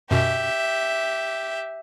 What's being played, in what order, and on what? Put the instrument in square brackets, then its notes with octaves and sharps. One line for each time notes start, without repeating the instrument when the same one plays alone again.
[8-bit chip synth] F#2 B2 [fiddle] G4 E5